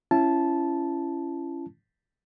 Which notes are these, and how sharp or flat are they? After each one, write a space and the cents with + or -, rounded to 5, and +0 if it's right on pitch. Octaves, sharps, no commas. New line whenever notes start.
C#4 +0 E4 +35 A5 -10